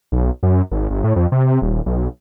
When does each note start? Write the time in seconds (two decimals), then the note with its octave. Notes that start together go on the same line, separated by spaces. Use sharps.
0.12 B1
0.43 F#2
0.71 G#1
0.90 G1
1.04 A2
1.16 F2
1.32 C3
1.62 D#1
1.86 B1